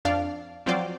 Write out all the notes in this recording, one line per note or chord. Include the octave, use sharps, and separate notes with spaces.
F2 D4 D5 F5
F3 F#3 C4 F4 C5 D5